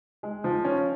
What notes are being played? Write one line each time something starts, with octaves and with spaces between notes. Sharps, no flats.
G#3
F3
C#4